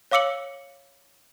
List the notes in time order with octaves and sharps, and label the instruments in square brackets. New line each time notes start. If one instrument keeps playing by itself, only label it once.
[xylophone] C#5 F5 D6 E6 C#7 F#7